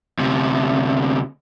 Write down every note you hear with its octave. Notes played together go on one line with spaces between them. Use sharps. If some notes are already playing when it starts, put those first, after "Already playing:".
D2 C3